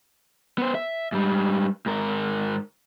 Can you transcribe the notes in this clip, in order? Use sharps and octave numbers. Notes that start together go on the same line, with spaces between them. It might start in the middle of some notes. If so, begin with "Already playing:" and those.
B3 C5
E5
G#2 G3
G#2 A#4